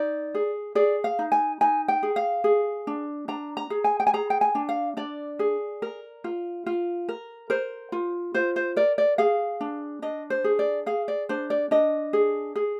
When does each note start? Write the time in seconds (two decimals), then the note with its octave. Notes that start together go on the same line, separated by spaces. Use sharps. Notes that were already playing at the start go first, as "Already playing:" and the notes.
Already playing: D#4 D5
0.35 G#4
0.75 G#4 D5
1.04 F5
1.19 D#4
1.32 G#5
1.61 D#4 G#5
1.88 G5
2.03 G#4
2.16 F5
2.44 G#4
2.87 D4
3.28 D4 A#5
3.57 A#5
3.70 G#4
3.84 G#5
4.00 G5
4.07 G#5
4.14 G#4 A#5
4.30 G5
4.41 G#5
4.55 D4
4.69 F5
4.97 D4 D5
5.39 G#4
5.82 A#4
6.24 F4
6.66 F4
7.09 A#4
7.50 A#4 C5
7.92 F4
8.34 F4 C5
8.56 C5
8.76 A#4 D5
8.98 D5
9.18 G#4 F5
9.61 D4
10.02 D4 D#5
10.30 C5
10.44 G#4
10.59 D5
10.86 G#4 F5
11.08 D5
11.29 D4 C5
11.50 D5
11.71 D4 D#5
12.13 G#4
12.56 G#4